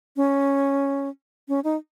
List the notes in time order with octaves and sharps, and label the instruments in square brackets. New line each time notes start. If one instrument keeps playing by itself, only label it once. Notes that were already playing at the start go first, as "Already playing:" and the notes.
[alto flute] C#4
C#4
D#4